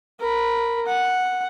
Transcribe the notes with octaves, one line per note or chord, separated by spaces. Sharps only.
A#4 B5
F#5